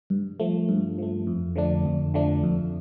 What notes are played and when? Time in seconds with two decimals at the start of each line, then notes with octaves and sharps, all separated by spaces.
0.10 G2
0.40 F3 A3
0.69 G2
0.98 F3 A3
1.27 F2
1.56 D3 F3 A3 D4
1.86 F2
2.14 D3 F3 A3 D4
2.43 F2